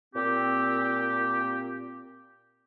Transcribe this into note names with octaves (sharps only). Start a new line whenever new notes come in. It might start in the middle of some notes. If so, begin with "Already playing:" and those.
A#2 C4 G4